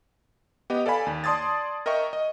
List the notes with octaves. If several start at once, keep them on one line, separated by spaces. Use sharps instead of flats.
B3 G4 D#5
A4 D5 F5 G#5 B5
D#2
D5 A5 C6 D#6 G#6 A6
A#4 D#5 E5 G5 C#6
D#5